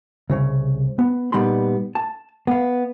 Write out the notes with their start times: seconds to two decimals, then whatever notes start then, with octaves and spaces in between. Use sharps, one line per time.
0.30 C2 C#3
0.99 B3
1.32 A#2 G3 B3 D#4 B5 C6
1.95 A5
2.47 B3 F5